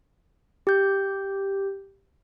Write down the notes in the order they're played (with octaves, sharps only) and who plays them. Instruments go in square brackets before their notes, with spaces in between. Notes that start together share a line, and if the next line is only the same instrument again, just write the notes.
[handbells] G4 G6